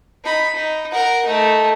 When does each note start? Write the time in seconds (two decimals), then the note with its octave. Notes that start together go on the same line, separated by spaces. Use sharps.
0.24 D#4 B5
0.55 D#4
0.91 A#4 F#5
1.25 A3 D#4